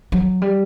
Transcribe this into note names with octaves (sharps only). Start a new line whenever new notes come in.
F#3
G3